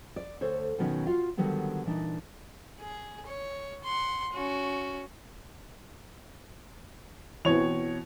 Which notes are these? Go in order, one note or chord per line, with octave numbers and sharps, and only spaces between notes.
D5
D2 A4 C5 C#5
B2 D#3 F#3 B3 C#4 D#4
F4 F#4 F5
D3 D#3 F#3 G3 B3
A#2 E3 D4 D#4
G#4
C#5
F#5 C6
C#4 F#4
B2 E3 C4 C#5 F7